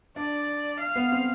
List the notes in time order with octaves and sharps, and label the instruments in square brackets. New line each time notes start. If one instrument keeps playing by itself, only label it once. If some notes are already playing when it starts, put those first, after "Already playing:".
[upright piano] D4 [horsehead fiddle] D5
[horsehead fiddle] F5
[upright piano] B3
C4